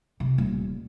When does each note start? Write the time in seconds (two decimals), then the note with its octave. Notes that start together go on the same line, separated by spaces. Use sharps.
0.20 C3
0.38 D#1